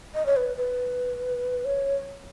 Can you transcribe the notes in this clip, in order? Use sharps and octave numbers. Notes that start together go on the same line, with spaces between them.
D#5
C#5
B4
B4
C#5